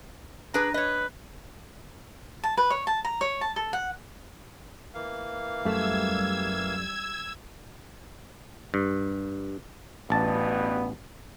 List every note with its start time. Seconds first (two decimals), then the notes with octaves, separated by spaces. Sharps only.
0.54 D4 G#4 B4 A#5
0.74 B4 C#5 D#5
2.43 A5
2.57 B4
2.70 C#5
2.87 A5
3.05 A#5
3.21 C#5
3.41 A5
3.56 A4
3.73 F#5
4.94 E3 A#3 F5
5.65 F#2 G3 A3 E6 G#6
8.74 G2
10.10 A1 G2 B2 B3 A5